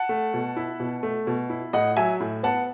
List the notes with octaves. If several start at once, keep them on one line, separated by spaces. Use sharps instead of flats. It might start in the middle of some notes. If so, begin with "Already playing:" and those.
Already playing: F#5 A5
A3
B2
E4
B2
A3
B2
E4
A2 D#5 F#5
F#3 E5 G#5
A2
B3 F#5 A5